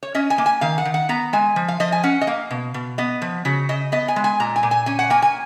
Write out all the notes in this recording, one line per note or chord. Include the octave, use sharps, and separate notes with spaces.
C#5
C#4 D#5
G#5
A#3
G#5
D#3 F5
F#5
D#3
F#5
B3 A#5
G#3 G#5
F3
F5
F3 D#5
G#5
C#4 F#5
D#5
A#3 F5
B2
B2
B3 D#5
F3
C#3 F#4
C#3 D#5
B3 D#5
G#5
G#3
G#5
A#2 A#5
G#5
A#2
G#5
C#4 G#5
F#5
A#3 G#5
G#5